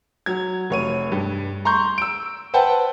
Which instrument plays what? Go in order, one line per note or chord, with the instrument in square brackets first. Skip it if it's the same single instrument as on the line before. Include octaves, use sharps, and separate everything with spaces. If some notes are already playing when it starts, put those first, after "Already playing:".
[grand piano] F#3 G#6
F1 C#5 D#7
G2
A#5 C6 C#6 G6
E6 D7
B4 C5 F#5 G5 A5